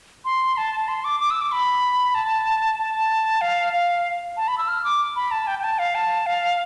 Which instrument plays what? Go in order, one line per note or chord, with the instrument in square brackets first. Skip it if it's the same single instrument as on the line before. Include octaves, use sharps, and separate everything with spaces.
[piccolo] C6
A5
C6
D6
D6
E6
D6
B5
A5
A5
F5
F5
A5
B5
E6
F6
D6
B5
A5
G5
G5
A5
F5
A5
F5